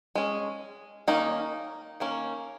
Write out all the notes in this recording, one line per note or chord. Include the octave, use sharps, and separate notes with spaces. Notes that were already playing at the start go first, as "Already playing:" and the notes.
G#3 C#4
D#3 A#3 C#4 D#4
D#3 A#3 C#4